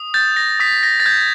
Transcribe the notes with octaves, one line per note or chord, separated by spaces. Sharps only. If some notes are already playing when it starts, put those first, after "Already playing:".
Already playing: D#6
G6 A6
A#6
D#6 B6
A#6
A6
G6 G#6